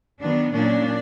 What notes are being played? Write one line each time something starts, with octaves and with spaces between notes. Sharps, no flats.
D#3 F#3 B3 D4
A#2 F#3 A#3 C#4 D4